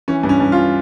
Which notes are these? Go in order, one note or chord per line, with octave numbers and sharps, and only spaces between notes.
E3 C#4
G2
C#4
G2
F4